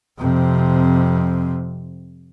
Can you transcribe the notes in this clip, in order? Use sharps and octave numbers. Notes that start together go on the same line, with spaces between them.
F2 C3